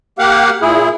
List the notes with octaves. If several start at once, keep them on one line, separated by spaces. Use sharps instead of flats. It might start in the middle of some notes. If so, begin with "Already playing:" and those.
A#3 G4 F5 F#5
A#2 E4 G#4